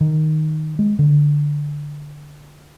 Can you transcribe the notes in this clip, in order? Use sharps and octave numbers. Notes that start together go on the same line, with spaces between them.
D#3
G#3
D3